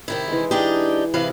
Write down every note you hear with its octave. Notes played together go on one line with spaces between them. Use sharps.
C3 D#3 E4
E3 G#3
D4 D#4 G4 G#4
C3 E3 E4 B4 D#5 F5